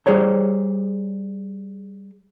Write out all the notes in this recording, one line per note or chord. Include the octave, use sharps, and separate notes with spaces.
G3 G#4 C5 C#5 A#5